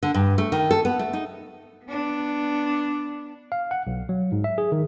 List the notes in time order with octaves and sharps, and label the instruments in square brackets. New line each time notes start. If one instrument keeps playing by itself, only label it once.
[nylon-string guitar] D3
G2
A3
D#3
A4
B3
A3
D#4
[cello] B3 D4
[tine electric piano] F5
F#5
B1
F#3
G#2
E5
G#4
D#3